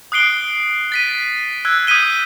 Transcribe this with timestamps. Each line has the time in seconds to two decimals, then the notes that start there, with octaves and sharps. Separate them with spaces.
0.12 D#6 F#6 C7 D7 G7
0.92 A6 B6 D#7
1.65 E6 F#6 G#6
1.87 D#6 G6 B6 D#7 G7